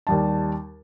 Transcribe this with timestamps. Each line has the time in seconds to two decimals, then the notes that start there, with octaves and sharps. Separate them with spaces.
0.07 D#2 G3 A5